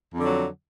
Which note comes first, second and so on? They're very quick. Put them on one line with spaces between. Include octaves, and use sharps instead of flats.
F2 D3 F#3